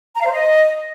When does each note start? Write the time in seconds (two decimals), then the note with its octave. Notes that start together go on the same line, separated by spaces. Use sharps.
0.16 A#5
0.21 F5
0.26 C5
0.31 D#5